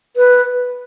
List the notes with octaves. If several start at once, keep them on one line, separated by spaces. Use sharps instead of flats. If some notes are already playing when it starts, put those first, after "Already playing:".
B4